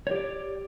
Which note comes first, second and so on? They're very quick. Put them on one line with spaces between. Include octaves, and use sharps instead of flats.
C#5 G4 D5